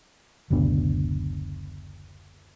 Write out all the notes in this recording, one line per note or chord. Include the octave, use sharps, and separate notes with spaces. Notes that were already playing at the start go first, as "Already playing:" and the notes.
F#1 D2 B2 D4